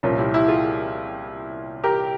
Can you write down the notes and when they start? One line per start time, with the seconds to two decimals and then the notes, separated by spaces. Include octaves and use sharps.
0.03 C2 A#2 F3 C#4 F4
0.18 E4 G4
0.33 E4 G4
0.48 F4 G#4
1.84 G4 A#4